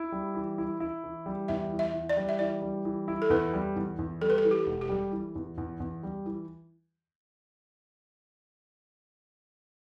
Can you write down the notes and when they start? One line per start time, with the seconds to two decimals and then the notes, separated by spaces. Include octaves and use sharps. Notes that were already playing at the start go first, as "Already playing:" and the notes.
Already playing: E4
0.12 G3
0.35 E3
0.58 E4
0.80 E4
1.04 E3
1.26 G3
1.48 E2 E5
1.72 E3
1.79 E5
1.94 E3
2.09 D5
2.17 G3
2.29 E5
2.39 E3 D5
2.62 G3
2.85 E3
3.08 E4
3.22 A4
3.30 E2 B4
3.53 G3
3.76 E2
3.99 E2
4.21 G3 A4
4.30 B4
4.38 A4
4.44 E3
4.51 G4
4.66 E1
4.81 G4
4.89 G3
5.12 E3
5.35 E2
5.58 E2
5.80 E2
6.03 G3
6.26 E3